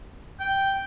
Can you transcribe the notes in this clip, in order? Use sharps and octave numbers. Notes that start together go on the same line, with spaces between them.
G5